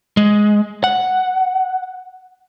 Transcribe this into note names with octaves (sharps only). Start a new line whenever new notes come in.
G#3
F#5